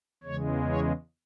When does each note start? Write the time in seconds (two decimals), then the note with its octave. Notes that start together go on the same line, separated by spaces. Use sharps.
0.24 E2 C#3 G#3 C#5
0.67 C#5